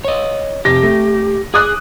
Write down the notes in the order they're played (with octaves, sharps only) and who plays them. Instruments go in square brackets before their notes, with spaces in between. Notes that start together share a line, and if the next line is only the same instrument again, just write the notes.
[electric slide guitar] C#5 D#5
[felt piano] F1 A#6 [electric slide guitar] G4
[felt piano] A3
[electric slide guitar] G#4 [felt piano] D6 D#6 F#6